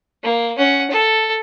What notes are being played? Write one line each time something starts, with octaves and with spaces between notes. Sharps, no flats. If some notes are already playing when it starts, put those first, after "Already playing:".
A#3
C#4 F#5
A4